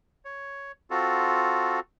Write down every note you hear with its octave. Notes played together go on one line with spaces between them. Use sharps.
C#5
C4 F4 F#4 A4